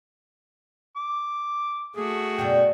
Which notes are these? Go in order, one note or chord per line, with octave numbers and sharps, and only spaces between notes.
D6
A3 F#4 G#4
F#2 B2 D3 G5